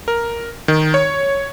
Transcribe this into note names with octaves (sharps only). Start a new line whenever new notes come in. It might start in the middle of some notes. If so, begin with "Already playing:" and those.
A#4
D#3
C#5